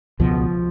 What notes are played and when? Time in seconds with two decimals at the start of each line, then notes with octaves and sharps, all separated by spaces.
0.20 C#2 B2 F3